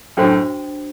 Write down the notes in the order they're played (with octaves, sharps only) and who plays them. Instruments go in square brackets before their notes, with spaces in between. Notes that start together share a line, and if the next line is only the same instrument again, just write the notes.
[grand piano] F#2 A2 [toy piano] D4 F#4 C5 G5